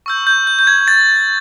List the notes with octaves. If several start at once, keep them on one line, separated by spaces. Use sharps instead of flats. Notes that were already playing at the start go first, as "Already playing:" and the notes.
C#6 E6 G6
G6
G6
G6
G#6
A6